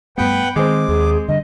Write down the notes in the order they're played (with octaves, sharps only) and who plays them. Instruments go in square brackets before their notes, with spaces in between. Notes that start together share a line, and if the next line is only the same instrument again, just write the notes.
[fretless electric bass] G2 A3 [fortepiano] B3 [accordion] B4 F#5 G5
[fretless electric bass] D#3 [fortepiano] G#3 C4 [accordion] D6
[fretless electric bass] D#2 [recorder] G#4
[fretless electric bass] G2 D3 [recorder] D#5